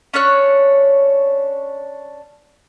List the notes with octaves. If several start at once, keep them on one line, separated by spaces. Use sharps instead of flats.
C#4 D4 C#5 F#6